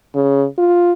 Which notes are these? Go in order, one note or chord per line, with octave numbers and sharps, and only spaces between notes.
C#3
F4